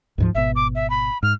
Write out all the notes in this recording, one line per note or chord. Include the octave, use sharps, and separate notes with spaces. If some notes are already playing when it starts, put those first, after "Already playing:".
D2 G#2 F3
G#1 B2 E5
D6
E5
B5
G#2 F6